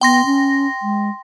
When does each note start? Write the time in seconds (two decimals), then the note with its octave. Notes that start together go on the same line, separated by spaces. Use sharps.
0.01 B3 G5 C6 A#6
0.25 C#4
0.82 G#3